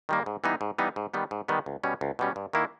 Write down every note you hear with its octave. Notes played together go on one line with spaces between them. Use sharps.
D#3 G3 A#3
G#2
E3 G3 B3 D#4
G#2
E3 G3 B3 D#4
G#2
D#3 G3 B3
G#2
D#3 G3 B3
C#2
B2 G3 C#4
C#2
B2 G3 C#4
G2
D#3 A#3 E4